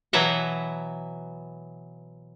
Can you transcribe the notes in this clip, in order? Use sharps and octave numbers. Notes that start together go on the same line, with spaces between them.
B2 E3 F#3 B4 E5 F#5